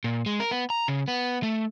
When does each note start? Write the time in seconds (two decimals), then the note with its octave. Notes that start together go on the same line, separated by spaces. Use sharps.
0.04 A#2
0.26 G#3
0.40 A#4
0.51 B3
0.70 A#5
0.88 C#3
1.08 B3
1.43 A3